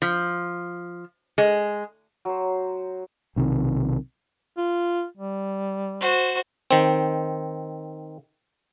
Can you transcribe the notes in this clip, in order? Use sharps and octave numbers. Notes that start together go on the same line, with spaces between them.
F3
G#3
F#3 C5
B1 C3 D#3
F4
G3
F#4 C5
D#3 C4